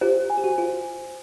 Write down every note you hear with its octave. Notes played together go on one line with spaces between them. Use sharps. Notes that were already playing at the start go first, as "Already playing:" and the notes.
F4 G4 C5
G#5
G4
F#4
F4 C5